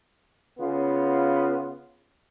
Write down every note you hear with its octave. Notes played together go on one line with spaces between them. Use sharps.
C#3 B3 F4